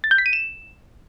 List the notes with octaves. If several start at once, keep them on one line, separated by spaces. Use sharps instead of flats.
A6
G6
B6
D#7
E7